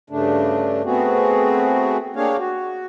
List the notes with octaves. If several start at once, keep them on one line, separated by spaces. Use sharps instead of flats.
G2 C#3 A3 D4
A3 B3 C4 F#4 G#4
A#3 D4 G4 G#4 C#5 F5
F#4